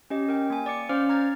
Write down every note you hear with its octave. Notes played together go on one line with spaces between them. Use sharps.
C#4 G4 D#5
A#4 G5
A#3 G#5
D5 D6 C#7
C#4 C5 D5 F5 D6 F6
A#5 F6 G#6 A6